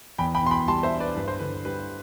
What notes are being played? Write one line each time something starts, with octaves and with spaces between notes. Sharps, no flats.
E2 G5 B5
G5 B5
B2 C6
G5 B5
G3 A5 C6
C5 E5
D4
B4 D5
G2 B4
C5
D3 B4
G3 B4